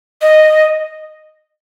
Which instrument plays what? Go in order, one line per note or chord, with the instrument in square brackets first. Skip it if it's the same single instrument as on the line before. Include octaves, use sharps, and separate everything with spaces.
[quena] D#5